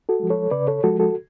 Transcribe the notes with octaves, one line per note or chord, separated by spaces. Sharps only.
F#4 A4
F3 G#3
A4 C#5
C#3 B4 D5
A4 C#5
F3 G#3 F#4 A4
F#4 A4